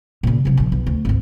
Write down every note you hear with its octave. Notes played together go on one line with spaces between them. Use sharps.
A#2 C#3
C3 F#3
A#1 F3
B1
D2
G#1 D2